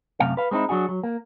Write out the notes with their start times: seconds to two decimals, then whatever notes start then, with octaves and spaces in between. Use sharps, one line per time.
0.20 F#2 C3 A3 F5
0.37 B4 F5
0.51 G#3 C4 C#4 D#4 E4
0.69 F#3 D4 F#4 G#4
0.89 F#3
1.03 A#3